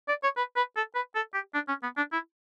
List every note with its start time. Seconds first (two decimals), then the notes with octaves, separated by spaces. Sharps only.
0.09 D5
0.23 C#5
0.37 B4
0.56 B4
0.76 A4
0.95 B4
1.15 A4
1.34 G4
1.54 D4
1.68 C#4
1.83 B3
1.97 D4
2.13 E4